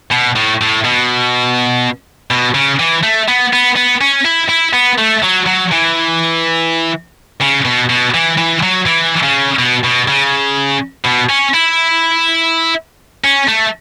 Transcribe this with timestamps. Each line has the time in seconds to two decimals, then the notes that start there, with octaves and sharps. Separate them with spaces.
0.12 B2
0.36 A2
0.61 A2
0.85 B2
2.31 B2
2.54 C#3
2.79 E3
3.03 A3
3.28 B3
3.53 B3
3.76 B3
4.01 C#4
4.25 E4
4.49 E4
4.74 B3
4.98 A3
5.22 F#3
5.46 F#3
5.71 E3
7.41 C#3
7.65 B2
7.89 B2
8.14 E3
8.38 E3
8.63 F#3
8.86 E3
9.23 C#3
9.59 B2
9.84 B2
10.08 C#3
11.04 B2
11.29 C#4
11.54 E4
13.24 C#4
13.48 A3